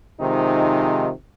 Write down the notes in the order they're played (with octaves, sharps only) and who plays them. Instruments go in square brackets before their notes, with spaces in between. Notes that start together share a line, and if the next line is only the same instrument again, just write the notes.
[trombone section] C3 D#3 F3 G#3 D#4